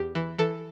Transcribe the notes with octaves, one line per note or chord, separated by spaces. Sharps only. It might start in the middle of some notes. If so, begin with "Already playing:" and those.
Already playing: E2 G4
E3
E3 A4